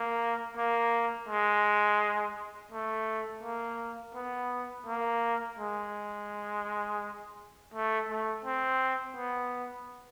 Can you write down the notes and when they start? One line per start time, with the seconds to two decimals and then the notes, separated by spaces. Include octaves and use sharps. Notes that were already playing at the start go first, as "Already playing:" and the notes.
Already playing: A#3
0.57 A#3
1.29 G#3
2.72 A3
3.43 A#3
4.15 B3
4.87 A#3
5.59 G#3
7.74 A3
8.09 A3
8.45 C4
9.17 B3